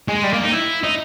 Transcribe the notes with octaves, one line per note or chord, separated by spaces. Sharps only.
G#3
G3
A#3
D#4
E4
D#4